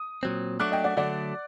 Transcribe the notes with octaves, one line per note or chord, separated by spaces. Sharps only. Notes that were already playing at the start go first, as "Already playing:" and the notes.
Already playing: D#6
A#2 F#3 C4
F#3 A3 D4 F#4 D6 F#6
D#5 G5
D5 F#5
D3 F#3 A3 D4 D5 F#5